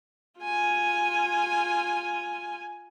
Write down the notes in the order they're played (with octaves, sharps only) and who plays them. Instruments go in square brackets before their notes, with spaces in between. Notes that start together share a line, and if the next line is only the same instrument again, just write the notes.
[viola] F4 G#5